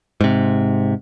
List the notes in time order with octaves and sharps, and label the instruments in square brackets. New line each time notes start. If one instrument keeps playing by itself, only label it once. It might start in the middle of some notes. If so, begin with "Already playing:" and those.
[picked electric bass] G#2 C3